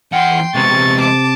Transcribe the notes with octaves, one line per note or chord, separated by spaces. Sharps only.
E2 F#5 G5 C6
C3 G#3 B3 C#6 A6
A5 D6